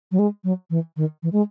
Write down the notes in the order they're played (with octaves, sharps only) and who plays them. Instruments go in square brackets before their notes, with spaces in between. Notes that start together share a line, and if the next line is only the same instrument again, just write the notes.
[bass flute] F#3
G#3
F#3
E3
D#3
E3
G#3